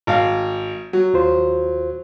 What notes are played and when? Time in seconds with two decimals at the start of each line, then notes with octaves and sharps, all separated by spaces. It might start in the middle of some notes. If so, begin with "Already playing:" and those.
0.07 G#1 F5
0.93 F#3
1.14 D#2 F4 C5